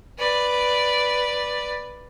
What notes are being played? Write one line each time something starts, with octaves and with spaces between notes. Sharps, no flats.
B4 D5